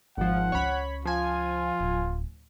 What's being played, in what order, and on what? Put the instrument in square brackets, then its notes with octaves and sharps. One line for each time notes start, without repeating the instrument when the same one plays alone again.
[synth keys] G#1 F3 [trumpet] F#5
[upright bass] C#2 C#4 [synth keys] C#5 B5
[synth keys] F3 G#5 [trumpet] F4
[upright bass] D1